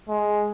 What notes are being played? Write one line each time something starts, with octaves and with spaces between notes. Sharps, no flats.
G#3